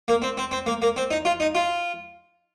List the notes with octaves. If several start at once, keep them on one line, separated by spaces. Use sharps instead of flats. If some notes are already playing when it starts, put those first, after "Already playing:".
A#3
C4
C4
C4
A#3
A#3
C4
D#4
F4
D#4
F4